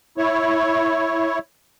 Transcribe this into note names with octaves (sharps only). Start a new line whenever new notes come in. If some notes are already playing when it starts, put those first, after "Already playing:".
E4 C#5